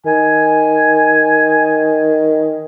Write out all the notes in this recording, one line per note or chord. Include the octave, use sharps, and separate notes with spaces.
D#3 G#5